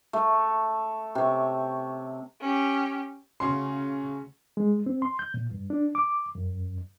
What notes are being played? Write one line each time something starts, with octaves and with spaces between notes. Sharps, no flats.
A3
C3 C#5
C#4 G4
C#3 A3 C#4 F#4 C6
G#3
C4
C6
G6
A#2
G2
D4
D6
F#2